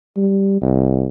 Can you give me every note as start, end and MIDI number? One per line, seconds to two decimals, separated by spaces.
0.17 0.57 55
0.62 1.08 36